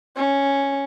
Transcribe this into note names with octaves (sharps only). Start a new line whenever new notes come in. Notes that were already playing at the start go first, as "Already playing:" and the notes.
C#4